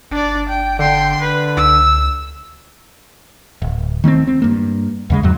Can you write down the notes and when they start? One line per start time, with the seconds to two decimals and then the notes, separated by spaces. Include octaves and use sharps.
0.11 G1 D4 D5
0.49 G5
0.79 D3 G5 C6
1.21 B4
1.57 C#2 E6
3.62 D1
4.04 D#3 A3 B3 C4
4.27 C4
4.42 G2 A#3
5.10 D#2 C#3 G#3
5.23 E2 G#2 F#3